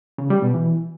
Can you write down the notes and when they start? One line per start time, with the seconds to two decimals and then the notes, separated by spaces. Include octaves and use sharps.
0.18 C#3
0.30 G3
0.42 B2
0.54 E3